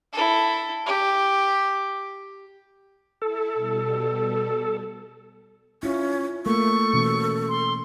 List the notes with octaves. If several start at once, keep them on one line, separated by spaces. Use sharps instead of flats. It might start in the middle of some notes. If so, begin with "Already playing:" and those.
E4 A4
G4
E4 A4
B2 G3
C#4 E4 F4
A3 A#3 A4 C#6
B2 E3 C#4
C6